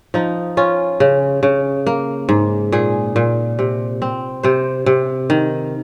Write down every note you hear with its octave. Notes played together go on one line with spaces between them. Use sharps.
F3 D#4
C#4 F4
C#3
C#3
A#3
G#2
A#2 G#4
A#2
C3
C4
C3 C5
C3
D#3